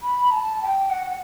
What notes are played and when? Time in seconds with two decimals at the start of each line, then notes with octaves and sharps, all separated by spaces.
0.03 B5
0.31 A5
0.62 G5
0.90 F#5